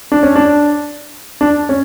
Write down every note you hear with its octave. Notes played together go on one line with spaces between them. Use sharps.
D4
C#4
D4
D4
C#4